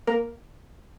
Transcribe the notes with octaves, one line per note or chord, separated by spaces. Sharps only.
A#3 A#4